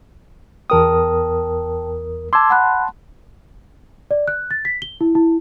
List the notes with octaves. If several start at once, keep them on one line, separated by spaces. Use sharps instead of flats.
E2 A#4 G5 A5 D#6
A5 C6 D6 E6 G#6
F#5 B5 F#6
D5
F#6
A6
B6
G7
E4
E4